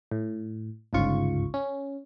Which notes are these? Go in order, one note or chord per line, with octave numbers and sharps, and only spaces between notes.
A2
G1 C#2 G#2 C#3 F4 C#6
C#4